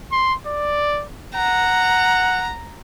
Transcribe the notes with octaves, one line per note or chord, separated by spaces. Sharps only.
C6
D5
F#5 A#5